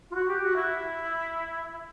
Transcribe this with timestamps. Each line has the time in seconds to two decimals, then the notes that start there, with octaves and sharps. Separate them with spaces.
0.10 F4
0.14 F#4
0.28 G4
0.42 F#4
0.55 E4